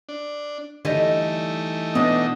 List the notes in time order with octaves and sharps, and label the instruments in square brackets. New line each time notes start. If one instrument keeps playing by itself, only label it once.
[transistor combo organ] D4
[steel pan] D3 [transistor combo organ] E3 A3 D#4 [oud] G3 D#5
[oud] B2 D4 [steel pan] B3 [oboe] D#5